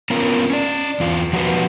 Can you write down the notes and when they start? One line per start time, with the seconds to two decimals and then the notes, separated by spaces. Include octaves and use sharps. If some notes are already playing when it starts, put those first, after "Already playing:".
0.10 B3 C#4 F4 A#4
0.50 C#4 D5
1.00 E2 F4
1.33 F3 F#3 F#4 G4 B4